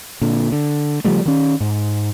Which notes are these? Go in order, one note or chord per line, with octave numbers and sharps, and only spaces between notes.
A#2 D3
D3
C#3 F3 G3 A3
D#3 C#4
G#2